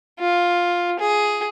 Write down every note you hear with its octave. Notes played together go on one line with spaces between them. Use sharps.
F4
G#4